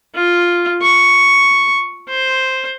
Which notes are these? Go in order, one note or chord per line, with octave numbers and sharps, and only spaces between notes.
F4
C#6
C5